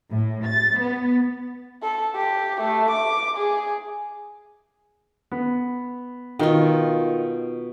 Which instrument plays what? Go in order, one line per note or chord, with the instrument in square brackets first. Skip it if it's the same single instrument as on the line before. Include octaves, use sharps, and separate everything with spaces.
[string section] A2
A6
B3
[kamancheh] A4
G4
A3
D6
G#4
[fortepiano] B3
[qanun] B2 F4 [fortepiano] D#3